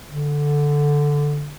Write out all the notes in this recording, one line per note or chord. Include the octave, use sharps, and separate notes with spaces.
D3